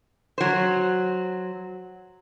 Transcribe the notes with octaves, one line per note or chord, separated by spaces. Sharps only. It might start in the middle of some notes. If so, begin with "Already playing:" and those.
F#3 C5